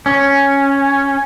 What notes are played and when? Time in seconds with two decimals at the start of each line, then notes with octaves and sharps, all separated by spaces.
0.06 C#4